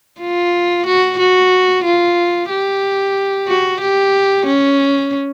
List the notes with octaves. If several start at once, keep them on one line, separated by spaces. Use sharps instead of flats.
F4
F#4
F#4
F4
G4
F#4
G4
C#4